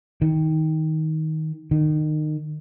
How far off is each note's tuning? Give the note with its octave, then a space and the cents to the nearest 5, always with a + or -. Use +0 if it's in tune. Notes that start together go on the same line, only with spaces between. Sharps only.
D#3 +15
D#3 -25